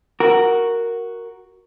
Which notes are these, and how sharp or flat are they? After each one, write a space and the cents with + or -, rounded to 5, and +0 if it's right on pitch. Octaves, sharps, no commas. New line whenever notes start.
F#4 +0 A#4 +0